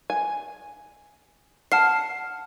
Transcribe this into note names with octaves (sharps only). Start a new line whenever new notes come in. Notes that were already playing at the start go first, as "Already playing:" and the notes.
G#5
F#5 A5 F6 C7